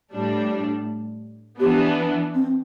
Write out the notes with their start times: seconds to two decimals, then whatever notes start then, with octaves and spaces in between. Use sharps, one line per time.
0.12 A2 G3 D4
1.59 E3 B3 D4 G4
2.35 C4